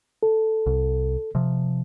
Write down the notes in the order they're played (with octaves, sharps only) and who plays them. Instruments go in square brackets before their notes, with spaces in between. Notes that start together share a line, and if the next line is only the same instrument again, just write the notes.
[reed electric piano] A4
[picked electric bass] C2
C3 F3